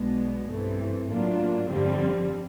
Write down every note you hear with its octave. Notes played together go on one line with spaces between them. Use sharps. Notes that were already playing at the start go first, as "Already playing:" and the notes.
Already playing: B1 B2 G#3 B3 D4
G2 E3 A3 C4
A2 F#3 A#3 D4 F4
G1 F2 D3 G3 C4